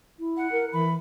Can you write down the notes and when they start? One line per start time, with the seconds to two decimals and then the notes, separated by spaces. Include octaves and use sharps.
0.19 E4
0.37 F#5
0.52 A#4
0.73 E3 B5